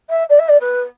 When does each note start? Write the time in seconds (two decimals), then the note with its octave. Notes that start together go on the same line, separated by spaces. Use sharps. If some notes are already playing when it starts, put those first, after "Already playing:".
0.09 E5
0.29 D5
0.39 E5
0.48 D5
0.60 B4